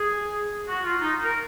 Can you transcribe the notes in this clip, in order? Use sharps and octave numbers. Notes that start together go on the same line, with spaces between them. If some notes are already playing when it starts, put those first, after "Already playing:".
Already playing: G#4
F#4
F4
D#4
A#4